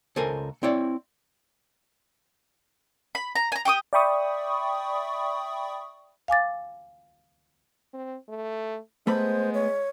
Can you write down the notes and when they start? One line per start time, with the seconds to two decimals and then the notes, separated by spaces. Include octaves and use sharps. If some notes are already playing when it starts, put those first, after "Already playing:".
0.16 C#2 A4 A#4 C5 G#5
0.63 C4 E4 C#5 D5
3.15 B5
3.36 A#5
3.52 G#5 A#5
3.65 G4 G5 C#6 D#6
3.93 D5 E5 G5 B5 C#6 D#6
6.28 F5 G#5 D6 A6
7.93 C4
8.29 A3
9.07 G#3 A3 B3 C5 B5
9.54 C#5